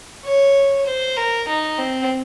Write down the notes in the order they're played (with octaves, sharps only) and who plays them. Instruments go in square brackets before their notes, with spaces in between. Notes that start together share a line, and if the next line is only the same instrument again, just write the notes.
[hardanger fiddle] C#5
C5
A#4
D#4
C4